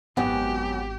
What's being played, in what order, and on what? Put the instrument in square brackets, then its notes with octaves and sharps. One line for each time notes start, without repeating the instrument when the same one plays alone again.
[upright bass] G#1 [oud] F#2 F#3 [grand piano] B3 [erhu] G4